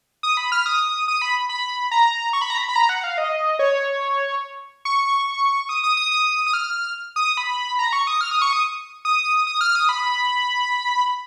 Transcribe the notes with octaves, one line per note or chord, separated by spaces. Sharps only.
D#6
B5
F6
D#6
D#6
B5
B5
A#5
C#6
B5
A#5
B5
B5
A#5
F#5
F5
D#5
C#5
C#6
D#6
D#6
D#6
D#6
D#6
F6
D#6
B5
A#5
C#6
D#6
F6
D#6
C#6
D#6
D#6
D#6
F6
D#6
B5